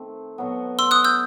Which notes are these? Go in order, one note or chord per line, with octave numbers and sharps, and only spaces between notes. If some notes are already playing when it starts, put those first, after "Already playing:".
Already playing: D#3 A3 C4
B2 F#3 B3
C6 E6
D#6 F#6
E6 G6